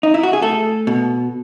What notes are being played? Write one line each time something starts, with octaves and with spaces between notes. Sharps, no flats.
D#4
E4
F#4
G#4
A3 A4
B2